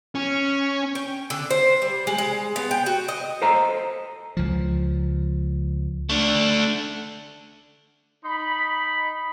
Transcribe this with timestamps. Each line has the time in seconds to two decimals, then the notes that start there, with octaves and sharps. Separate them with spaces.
0.15 C#4
0.95 G5
1.30 D3
1.50 C5
1.82 G3
2.07 G#3
2.18 G#3
2.56 B3
2.71 G5
2.86 F#4
3.09 D#5
3.42 A4 C5 D#5 E5 A#5
4.37 C#2 F3
6.09 A3 D4
8.25 D#4 B5